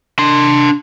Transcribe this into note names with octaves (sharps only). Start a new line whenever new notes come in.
D4 C6